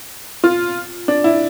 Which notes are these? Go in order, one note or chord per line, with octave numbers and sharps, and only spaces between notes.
F4
D4
E4